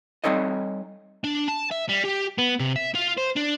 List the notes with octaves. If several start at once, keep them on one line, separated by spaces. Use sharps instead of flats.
G3 C4 D#4 A4 C#5 D#5
D4
A5
E5
G3
G4
B3
C3
E5
F4
C5
D4